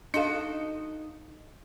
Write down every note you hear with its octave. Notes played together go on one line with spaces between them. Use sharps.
D4 D#4 F#4 A4 F5